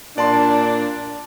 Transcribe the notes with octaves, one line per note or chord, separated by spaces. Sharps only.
A#2 D4 D5 A5 C6